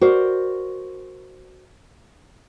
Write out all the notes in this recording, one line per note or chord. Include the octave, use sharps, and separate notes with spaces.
F#4 A#4 C5 D5